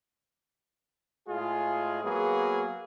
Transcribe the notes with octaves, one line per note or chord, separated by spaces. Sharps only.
A2 G#3 F4 G#4
F#3 A#3 B3 G#4